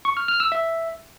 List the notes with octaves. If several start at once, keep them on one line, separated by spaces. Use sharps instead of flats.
C#6
F6
F6
E6
E5